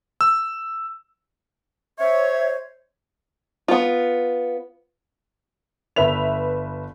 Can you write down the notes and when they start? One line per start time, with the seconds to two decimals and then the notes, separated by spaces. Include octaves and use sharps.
0.21 E6
1.99 C5 C#5 E5
3.68 B3 F4
5.96 G1 B4 E5 F7